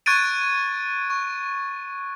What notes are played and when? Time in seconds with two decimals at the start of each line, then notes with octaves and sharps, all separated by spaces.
0.06 C#6 F#6 G#6 A6 D7 D#7
1.10 C#6